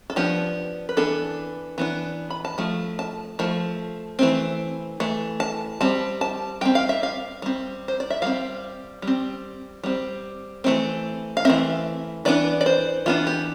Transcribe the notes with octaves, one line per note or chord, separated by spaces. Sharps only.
A4
F3 B3 D4 G4
B4
E3 B3 D4 A4
E3 B3 D4
B5
A5
F3 A3
A5
F3 A3
E3 A3 C4
E3 A3
A5
G3 C4 A5
A5
G3 C4 G5
F5
E5
F5
G3 C4
C5
D5
E5
G3 C4 F5
G3
C4
G3 C4
E3 A3 C4
F5
E3 A3 C4 E5
E3 B3 D4 D5
D5
C5
E3 B3 D4 F4
G4